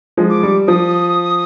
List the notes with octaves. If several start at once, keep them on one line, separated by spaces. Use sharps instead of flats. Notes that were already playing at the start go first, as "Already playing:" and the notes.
F3 G#3
D6
G3
F3 D#6